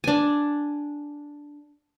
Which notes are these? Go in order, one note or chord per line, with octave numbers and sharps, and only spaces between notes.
D4 G#5